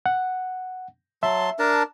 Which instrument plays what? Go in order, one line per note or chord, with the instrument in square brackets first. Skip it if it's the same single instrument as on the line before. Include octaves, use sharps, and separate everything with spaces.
[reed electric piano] F#5
[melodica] F#3 A5 C6 [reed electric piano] E5
[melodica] D4 A#4 A5